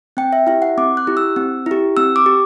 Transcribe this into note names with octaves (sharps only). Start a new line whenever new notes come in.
C4 G5
E5
E4 G4 E5
F#5
C4 D6
F#6
E4 G4
E6
C4
E4 G4
C4 E6
D6
G4